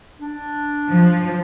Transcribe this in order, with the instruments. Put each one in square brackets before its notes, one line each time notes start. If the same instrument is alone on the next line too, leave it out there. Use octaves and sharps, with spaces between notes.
[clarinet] D4
[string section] F3